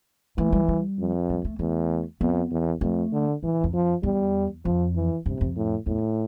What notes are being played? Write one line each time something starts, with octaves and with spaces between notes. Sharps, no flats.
E3 A3
G3
G3
F2
G3
A3
E2 A3
F2 B3
E2
F2 A3
D3
E3 G3
A2
F2
F3
E2 G3
F2 F3
E3
G2 C3
F2
A2
E2 A2